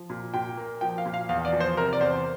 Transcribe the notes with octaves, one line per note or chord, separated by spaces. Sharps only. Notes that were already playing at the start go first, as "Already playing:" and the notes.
Already playing: F3
A#2
A#2 G5
A#3
F3 G5
F5
A#2
F5
E2 F5
D5
F3
C5
C3 A#4
D5
E2 C5